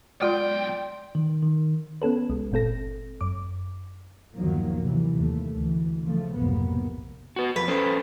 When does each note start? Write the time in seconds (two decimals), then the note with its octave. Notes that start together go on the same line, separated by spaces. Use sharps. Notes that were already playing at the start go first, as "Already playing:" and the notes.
0.22 B1 G#3 F4 D5 G5 C6
1.15 D#3
1.43 D#3
2.02 B3 C#4 A4 B4
2.30 C2 G#3
2.52 G1 A#2 C4 A4 A#6
3.21 F#2 D6
4.35 G1 D#2 D#3 F3 F#3 A#3
4.80 C3 E3
5.14 D#2 A3
5.53 D2 E3
6.03 C#3 F3 A3
6.35 F1 B1 G#2 C3 A#3 B3
7.36 F#4 B4
7.56 F2 B4
7.68 C#4 A4 C5